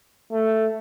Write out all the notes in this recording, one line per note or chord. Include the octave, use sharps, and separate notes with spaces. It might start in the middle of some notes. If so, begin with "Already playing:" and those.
A3